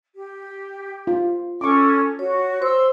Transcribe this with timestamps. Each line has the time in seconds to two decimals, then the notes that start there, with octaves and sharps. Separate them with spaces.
0.15 G4
1.07 F4
1.61 C#4 A4 C#6 D6
2.19 F#4 C#5
2.62 C5 C6 E6